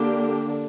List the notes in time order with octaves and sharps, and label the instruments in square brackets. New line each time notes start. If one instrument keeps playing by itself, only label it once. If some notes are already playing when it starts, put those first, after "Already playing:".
Already playing: [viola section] D3 A#3 D4 G4